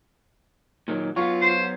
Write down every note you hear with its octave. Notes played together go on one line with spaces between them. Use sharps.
A#2 D#3 F#3
F#3 B3 F4 F5 C#6
C5